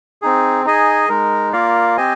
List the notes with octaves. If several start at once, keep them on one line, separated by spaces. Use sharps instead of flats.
C4 D#4 G#4
D#4 G#4 D#5 G#5
G#3 D#4 A#4
A#3 F4 A#4 D5 F5
C4 G4 C5 D#5 G#5